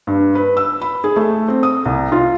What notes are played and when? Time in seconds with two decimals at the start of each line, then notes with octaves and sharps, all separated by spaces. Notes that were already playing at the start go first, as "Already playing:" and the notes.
0.07 G2
0.35 B4
0.57 E6
0.81 B5
1.04 G#4
1.16 A3
1.48 C4
1.63 D#6
1.85 C2
2.12 F4